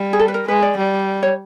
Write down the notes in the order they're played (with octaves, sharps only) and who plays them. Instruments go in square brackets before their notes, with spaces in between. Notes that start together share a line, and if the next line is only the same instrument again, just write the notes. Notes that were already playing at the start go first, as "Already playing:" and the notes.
Already playing: [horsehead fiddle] G3
[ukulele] G#4
A4
B4
A#4
[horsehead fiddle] G#3 [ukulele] B4
[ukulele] D5
[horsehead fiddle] G3
[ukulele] C#5